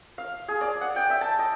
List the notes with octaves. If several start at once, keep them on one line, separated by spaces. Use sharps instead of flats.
F5
G#4
D5
F#5
G5
E5
A5
D#5